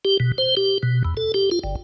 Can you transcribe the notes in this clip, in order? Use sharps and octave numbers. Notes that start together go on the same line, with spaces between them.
G4
B2
C5
G4
B2
E2
A4
G4
F4
G1